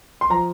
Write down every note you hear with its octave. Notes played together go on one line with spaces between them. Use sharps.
C6
F3 A#5